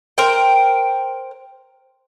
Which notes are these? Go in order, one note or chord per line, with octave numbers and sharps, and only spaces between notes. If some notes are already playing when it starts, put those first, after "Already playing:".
A#4 C5 G5